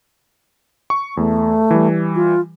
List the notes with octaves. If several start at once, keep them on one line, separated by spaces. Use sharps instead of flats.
C#6
E2 A3
E3 G3
F4